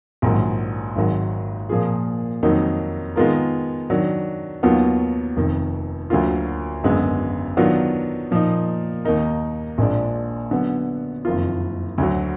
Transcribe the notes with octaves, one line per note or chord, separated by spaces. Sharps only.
A#1 G#2 D#3 F#3
G#1 G#2 D#3 F#3
A#2 F3 A#3 F4 G#4
F2 D#3 F#3 A#3 D#4
D#3 G#3 B3 F4 A#4
D#3 F#3 D4
D#2 D#3 F#3 B3 F4
F1 F2 D#3
D2 D3 F#3 A#3 F4
G#1 F#2 D3 G#3 B3
D#3 F#3 B3 D4 F4
A#2 F3 A#3 D#4
D#2 D#3 A#3 D#4 A#4
A#1 A#2 G#3 D4
D3 F#3 B3
F#1 F2 D#3 A#3 F4
D2 D3 F#3